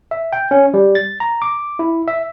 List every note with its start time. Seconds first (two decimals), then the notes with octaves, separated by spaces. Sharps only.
0.11 E5
0.33 G5
0.51 C#4
0.74 G3
0.95 A6
1.20 A#5
1.42 D6
1.79 E4
2.08 E5